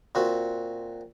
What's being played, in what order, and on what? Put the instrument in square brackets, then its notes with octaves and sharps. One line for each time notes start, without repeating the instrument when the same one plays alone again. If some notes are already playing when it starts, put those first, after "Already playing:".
[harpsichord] A#2 C4 F#4